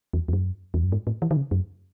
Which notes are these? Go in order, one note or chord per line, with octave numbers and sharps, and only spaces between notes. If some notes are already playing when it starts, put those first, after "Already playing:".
E2
E2
F#2
E2
F#2
G#2
A2
E3
D#3
C#3
F#2